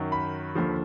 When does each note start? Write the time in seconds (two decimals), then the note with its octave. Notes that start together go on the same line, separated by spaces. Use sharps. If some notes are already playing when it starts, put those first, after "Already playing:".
Already playing: F#2 D#3 F#3
0.12 B5
0.55 D#2 D3 F3